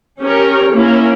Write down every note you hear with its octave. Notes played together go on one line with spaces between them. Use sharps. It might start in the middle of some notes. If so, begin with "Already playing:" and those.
C#4 G4 A#4 C#5
A#3 C#4 E4 A#4